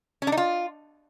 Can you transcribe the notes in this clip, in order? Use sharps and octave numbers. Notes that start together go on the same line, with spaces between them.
C#4
D4
D#4
F4